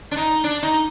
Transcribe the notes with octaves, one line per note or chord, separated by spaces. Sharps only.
D4
D#4
D4
D#4